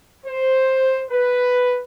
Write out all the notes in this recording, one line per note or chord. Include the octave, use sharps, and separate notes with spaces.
C5
B4